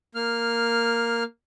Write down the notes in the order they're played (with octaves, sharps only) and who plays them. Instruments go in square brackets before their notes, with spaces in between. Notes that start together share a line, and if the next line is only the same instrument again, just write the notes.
[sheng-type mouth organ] A#3 F6